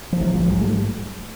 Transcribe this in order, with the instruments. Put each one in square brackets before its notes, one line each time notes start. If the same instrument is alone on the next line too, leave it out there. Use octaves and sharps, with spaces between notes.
[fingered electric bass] F3
A#1 E3 F#3
F3 G3
G#2 F#3 G#3
G3 A3